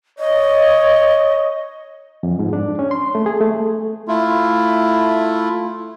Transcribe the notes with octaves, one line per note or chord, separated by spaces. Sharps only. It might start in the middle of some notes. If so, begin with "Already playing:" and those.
C#5 D#5
F2
G#2
D4
C#4
C6
A3
G#4
A3
A3 E4 F4